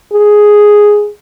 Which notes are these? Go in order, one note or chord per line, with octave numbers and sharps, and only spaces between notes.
G#4